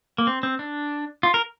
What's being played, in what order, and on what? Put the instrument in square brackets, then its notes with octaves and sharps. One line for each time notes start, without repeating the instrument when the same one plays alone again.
[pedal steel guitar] A#3
C4
C4
D4
F4
A#4